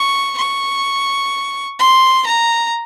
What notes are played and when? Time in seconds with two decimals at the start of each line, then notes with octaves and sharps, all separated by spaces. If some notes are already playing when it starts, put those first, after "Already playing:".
Already playing: C#6
0.37 C#6
1.79 C6
2.26 A#5